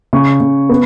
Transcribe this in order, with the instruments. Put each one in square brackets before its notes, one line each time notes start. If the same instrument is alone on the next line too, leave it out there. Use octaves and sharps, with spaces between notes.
[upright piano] C#3 C#6
C#3
B3